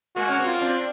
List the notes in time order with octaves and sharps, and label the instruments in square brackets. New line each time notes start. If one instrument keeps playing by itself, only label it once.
[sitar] G#3 A#3 [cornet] F#4
[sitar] C#4
A#3 C4
[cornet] F4
[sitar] C4 D4